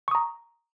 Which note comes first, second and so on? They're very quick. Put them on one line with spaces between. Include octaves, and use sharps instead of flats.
C#6 D#6 A#5